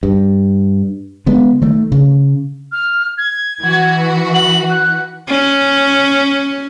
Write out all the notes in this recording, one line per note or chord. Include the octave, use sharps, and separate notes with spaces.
G2
D3 G#3 B3
D#3 A3
C#3
F6
G#6
E3 F#4
F#7
F#6
C#4